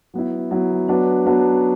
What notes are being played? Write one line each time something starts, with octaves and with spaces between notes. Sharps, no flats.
F#3 B3 E4
F#3 B3 E4
F#3 B3 D4 F#4 B4
F#3 B3 D4 F#4 B4